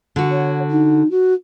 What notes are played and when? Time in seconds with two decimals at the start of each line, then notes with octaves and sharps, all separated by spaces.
0.16 D3 F#4
0.31 C#5
0.70 D#4
1.11 F#4